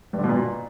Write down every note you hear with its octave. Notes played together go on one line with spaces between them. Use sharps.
G2
D3
B2
A#2